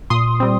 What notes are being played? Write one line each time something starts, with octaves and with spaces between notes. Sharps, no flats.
A#2 C6 D#6
G3 C4